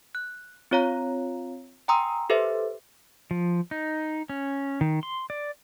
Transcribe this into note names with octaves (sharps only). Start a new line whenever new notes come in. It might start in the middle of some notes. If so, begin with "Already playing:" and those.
F#6
C4 F4 C#5 F5 A#5
G5 G#5 A#5 C6 D#6 E6
G4 A4 B4 C5 E5
F3
D#4
C#4
D#3
C6
D5